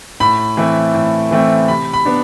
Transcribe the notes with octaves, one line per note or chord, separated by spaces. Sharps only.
A2 B5
E3 A3 C4 E4
A2
E3 A3 C4 E4
C3 B5
B5
B3 D4